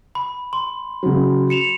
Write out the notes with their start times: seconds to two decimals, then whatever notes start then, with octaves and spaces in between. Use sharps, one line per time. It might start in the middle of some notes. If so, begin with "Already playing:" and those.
0.15 B5
0.53 C6
1.03 C#3 F#3
1.50 C#7 E7 F7